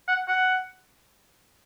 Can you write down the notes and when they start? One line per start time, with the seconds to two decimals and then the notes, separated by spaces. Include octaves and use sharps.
0.08 F#5
0.28 F#5